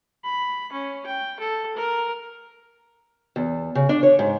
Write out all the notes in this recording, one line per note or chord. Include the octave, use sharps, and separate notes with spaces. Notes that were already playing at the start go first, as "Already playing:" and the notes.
B5
C#4
G5
A4
A#4
E2
C#3
D4
C#5
G#2